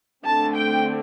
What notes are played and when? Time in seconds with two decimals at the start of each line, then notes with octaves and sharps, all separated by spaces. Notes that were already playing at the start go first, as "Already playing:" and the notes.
0.24 D3 A3 C4 A5
0.55 G5